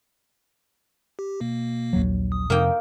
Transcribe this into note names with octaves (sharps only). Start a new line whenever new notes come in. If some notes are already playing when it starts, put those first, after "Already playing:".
G4
B2 A#3
A#1 D#2 F#3
D#6
F2 C3 A#3 D#4 G5